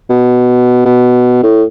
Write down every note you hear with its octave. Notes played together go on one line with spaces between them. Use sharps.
B2
B2
A2